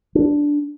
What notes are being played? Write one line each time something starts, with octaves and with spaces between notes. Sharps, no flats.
D4